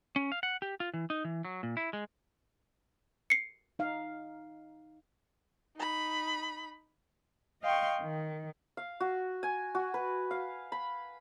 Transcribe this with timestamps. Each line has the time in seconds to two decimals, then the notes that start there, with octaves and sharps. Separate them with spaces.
0.16 C#4
0.32 F5
0.43 F#5
0.62 G4
0.80 F4
0.94 E3
1.10 D#4
1.25 E3
1.45 F#3
1.63 A#2
1.77 E4
1.93 G#3
3.30 C7 C#7
3.79 D#4 F5
5.76 D#4 B5
7.62 D#5 F5 G5 C6 C#6
8.02 D#3
8.77 F5
9.00 F#4
9.43 G#5
9.75 F#4
9.94 B4
10.31 F5
10.72 B5